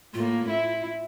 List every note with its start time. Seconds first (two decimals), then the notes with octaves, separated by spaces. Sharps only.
0.14 A2 A#3 F4
0.49 E4